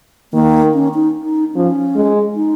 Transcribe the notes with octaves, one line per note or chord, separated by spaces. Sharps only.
D#3 A#3
C#4
D#4
D#4
F3 C#4
G#3
D#4